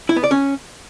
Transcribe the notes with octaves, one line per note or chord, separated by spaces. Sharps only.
E4
B3
D5
C#4